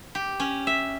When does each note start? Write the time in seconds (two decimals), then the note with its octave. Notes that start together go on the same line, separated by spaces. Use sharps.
0.15 G4
0.40 C#4
0.67 E5